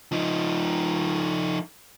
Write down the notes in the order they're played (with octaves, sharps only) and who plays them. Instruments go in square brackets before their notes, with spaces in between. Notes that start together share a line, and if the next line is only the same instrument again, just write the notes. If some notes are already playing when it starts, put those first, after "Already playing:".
[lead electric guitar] F3 D#4